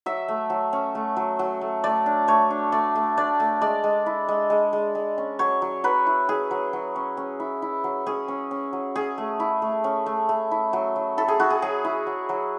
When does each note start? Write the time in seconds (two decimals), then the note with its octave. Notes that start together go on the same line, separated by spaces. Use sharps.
0.06 F#3 E5
0.28 A3
0.50 F#3
0.73 C#4
0.95 A3
1.17 F#3
1.39 F#3
1.61 A3
1.84 A3 D5
2.06 D4
2.28 A3 C#5
2.50 D4
2.72 A3 D5
2.95 A3
3.18 D4 D5
3.40 A3
3.61 G#3 D5
3.84 G#3
4.06 E4
4.28 G#3
4.50 G#3
4.73 G#3
4.95 G#3
5.18 C#4
5.39 F#3 C#5
5.62 F#3
5.84 F#3 B4
6.07 E4
6.29 E4 G#4
6.51 F#3
6.73 F#3
6.96 C#4
7.17 C#4
7.40 E4
7.62 E4
7.84 F#3
8.06 C#4 G#4
8.28 C#4
8.51 C#4
8.73 F#3
8.96 C#4 G#4
9.18 A3
9.40 E4
9.62 A3
9.84 C#4
10.06 A3
10.29 A3
10.51 E4
10.73 F#3
10.96 F#3
11.18 E4 A4
11.28 G#4
11.40 E4 F#4
11.50 G#4
11.62 F#3 G#4
11.85 E4
12.07 F#3
12.29 F#3